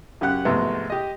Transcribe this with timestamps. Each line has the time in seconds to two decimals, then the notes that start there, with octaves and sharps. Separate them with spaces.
0.21 F#2 C#3 G4 F#5 F#6
0.45 F2 G#2 C3 G#3 A3 B3
0.90 G4 D#5